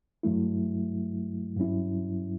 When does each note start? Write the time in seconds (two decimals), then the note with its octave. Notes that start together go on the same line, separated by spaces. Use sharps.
0.23 G2 F#3 A3 E4
1.57 G2 F#3 C#4 E4